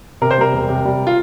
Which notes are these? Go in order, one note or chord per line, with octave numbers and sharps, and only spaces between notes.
C3 A#4
C5
G3 A#4
E1
C3
G3
F4